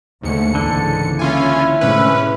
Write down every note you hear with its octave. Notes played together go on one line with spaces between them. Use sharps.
D#2 G#2 D3 A3 C#7
C#2 D3 E3 A#3 A5
C#4 E4 F4 G#5
A2 C3 G#3 C#4 B4